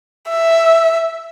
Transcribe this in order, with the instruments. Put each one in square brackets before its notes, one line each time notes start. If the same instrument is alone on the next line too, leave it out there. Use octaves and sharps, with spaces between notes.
[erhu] E5